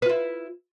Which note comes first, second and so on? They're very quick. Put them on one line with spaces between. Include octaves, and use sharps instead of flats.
B4 F4 E4